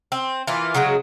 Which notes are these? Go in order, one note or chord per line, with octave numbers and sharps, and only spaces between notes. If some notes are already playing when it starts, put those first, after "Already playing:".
C4
E3 A#3 F4
C#3 F#3 G#3 F#4